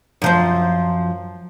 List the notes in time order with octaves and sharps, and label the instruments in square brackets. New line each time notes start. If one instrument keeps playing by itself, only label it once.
[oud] F#2 F3 C5